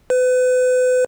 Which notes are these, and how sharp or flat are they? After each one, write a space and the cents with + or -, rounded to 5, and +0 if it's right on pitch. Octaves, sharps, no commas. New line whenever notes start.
B4 +35